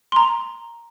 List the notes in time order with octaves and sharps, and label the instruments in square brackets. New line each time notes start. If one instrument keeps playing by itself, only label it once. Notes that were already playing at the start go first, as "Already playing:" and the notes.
[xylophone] A#5 C6